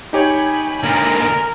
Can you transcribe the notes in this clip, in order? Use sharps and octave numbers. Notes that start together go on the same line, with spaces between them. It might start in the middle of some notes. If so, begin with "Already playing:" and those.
D#4 G4 C#5 G#5 B5
D3 A#3 A#4